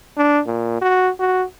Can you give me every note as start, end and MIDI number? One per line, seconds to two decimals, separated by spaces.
0.18 0.41 62
0.47 0.77 46
0.81 1.10 66
1.20 1.44 66